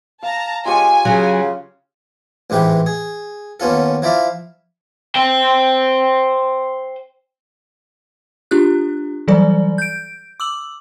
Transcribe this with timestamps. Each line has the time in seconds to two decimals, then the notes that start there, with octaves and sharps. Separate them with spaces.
0.23 F5 A5 A#5
0.65 C#3 G#3 F4 G4 C#5 G#5
1.05 C#3 F#3
2.50 A1 G#2 E3 G4 B4
2.86 G#4
3.60 D#2 B3 C#4 F4 A4
4.02 F3 E4 D5 E5 F5
5.15 C5 G5
8.51 D4 F4 G4 F#6
9.28 E3 F#3 G3 A4 D5
9.78 G6 D7
10.40 D6 E6 F#7